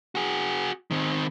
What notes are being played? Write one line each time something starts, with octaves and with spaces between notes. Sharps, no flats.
F#4 G#4
D#3 C4